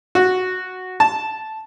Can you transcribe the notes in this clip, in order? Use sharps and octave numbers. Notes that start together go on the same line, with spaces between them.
F#4
A5